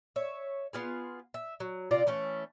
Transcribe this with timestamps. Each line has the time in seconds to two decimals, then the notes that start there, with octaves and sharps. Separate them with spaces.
0.16 C#5 E5
0.73 B3 F4 G#4
1.34 E5
1.60 F#3
1.91 C3 F4 D5 A#5
2.07 E3 A3 C#4